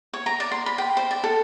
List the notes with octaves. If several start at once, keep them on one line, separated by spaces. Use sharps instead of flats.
C#5
A#5
D5
C6
B5
G5
C5
D5
A4